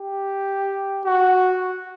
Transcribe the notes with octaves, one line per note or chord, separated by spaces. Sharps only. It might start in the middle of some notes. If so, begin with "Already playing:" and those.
Already playing: G4
F#4